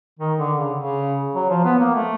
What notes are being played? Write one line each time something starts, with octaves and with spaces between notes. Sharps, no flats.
D#3
D3
C#3
C#3
F#3
F3
B3
A#3
A3